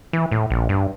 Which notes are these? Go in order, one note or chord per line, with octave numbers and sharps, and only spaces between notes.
E3
A2
A#1
G2